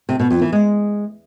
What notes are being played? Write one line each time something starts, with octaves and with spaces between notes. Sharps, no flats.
C3
B2
F2
E3
G#3